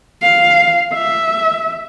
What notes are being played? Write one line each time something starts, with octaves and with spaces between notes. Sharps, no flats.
F5
E5